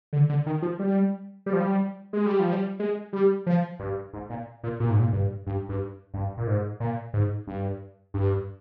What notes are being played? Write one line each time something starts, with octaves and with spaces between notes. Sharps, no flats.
D3
D3
D#3
F3
G3
G3
F3
G3
G#3
G3
F3
G3
G#3
G3
F3
G2
G#2
A#2
A#2
A#2
G#2
A#2
G2
G2
G2
G2
A#2
G#2
A#2
G#2
G2
G2